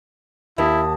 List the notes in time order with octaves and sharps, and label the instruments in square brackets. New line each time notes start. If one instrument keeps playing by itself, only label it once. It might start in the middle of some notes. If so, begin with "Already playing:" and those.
[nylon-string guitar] D#2 [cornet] E4 [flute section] A5 D#6